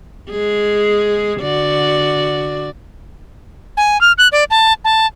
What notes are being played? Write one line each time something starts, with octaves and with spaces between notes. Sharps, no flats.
G#3 G#4
D3 F#4 D5
G#5
F6
F#6
D5
A5
A5